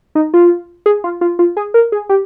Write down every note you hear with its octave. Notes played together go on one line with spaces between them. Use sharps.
D#4
F4
G#4
F4
F4
F4
G#4
A#4
G#4
G4